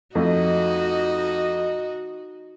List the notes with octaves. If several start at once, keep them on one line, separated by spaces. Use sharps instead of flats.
F2 A3 D#4 F#4 D#5